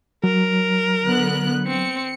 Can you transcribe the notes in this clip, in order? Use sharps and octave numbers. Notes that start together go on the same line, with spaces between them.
F#3 A#4
D3 B3 F#6
C4 C#7